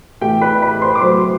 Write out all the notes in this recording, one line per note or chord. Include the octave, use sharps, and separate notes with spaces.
A2 E3 A3 G4 G5
B4 B5
B4 B5
C5 C6
D6
A2 F#3 A3 C5 C6